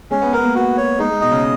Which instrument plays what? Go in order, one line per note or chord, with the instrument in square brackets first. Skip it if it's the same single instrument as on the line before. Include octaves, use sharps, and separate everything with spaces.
[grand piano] G#3 [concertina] C#4
[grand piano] B3
[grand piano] B3 [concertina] A#4
[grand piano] A#3
[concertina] F#4
C#5
[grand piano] G#3 [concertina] D#4
[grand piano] G#3
[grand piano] B2 [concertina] D#5
[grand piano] C#3